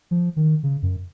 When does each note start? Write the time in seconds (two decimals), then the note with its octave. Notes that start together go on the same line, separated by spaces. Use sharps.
0.11 F3
0.36 D#3
0.63 C#3
0.82 F#2